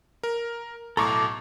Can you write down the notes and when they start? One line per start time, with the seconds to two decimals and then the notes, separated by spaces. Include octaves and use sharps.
0.23 A#4
0.97 B1 A2 A4 A#5 C#6 D6